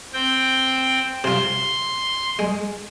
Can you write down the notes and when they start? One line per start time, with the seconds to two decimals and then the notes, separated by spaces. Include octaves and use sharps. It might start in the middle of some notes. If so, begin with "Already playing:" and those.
0.13 C4 G5
1.24 C3 F4 C6
2.39 G#3